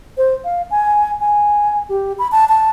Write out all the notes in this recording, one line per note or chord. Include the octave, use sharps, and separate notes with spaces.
C5
F5
G#5
G#5
G4
B5
A5
A5